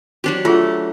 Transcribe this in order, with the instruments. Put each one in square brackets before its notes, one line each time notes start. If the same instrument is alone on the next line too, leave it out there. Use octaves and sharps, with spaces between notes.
[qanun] F#3 D4 G4 [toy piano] F#4
[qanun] A3 [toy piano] F4 G#4 F#5